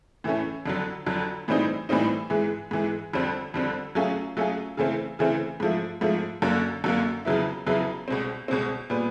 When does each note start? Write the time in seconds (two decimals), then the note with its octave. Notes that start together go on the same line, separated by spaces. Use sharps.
0.24 A2 E3 A3 C#4
0.66 F2 D3 F#3
1.06 F2 D3 F#3
1.48 A2 E3 G3 C4 D#4
1.89 A2 E3 G3 C4 D#4
2.30 G#2 E3 G#3
2.71 G#2 E3 G#3
3.13 F2 D3 G3 C4
3.54 F2 D3 G3 C4
3.95 F#3 A3 C#4 F4 G#4
4.37 F#3 A3 C#4 F4 G#4
4.77 C#3 E3 A3 C4
5.19 C#3 E3 A3 C4
5.60 G#2 F3 A3
6.01 G#2 F3 A3
6.42 F#2 D3 F#3 A#3
6.84 F#2 D3 F#3 A#3
7.25 F2 C#3 F#3 B3 E4
7.67 F2 C#3 F#3 B3 E4
8.08 C2 B2 G#3 C4
8.48 C2 B2 G#3 C4
8.90 A#2 G3 B3